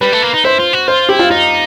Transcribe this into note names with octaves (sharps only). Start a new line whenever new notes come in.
G3 B4
A3
A#3
D#4
E4 C5
F4
F#4
F4 C5
E4 G4
F4
D#4 F4